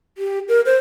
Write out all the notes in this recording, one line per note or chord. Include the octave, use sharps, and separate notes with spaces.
G4
A#4
C5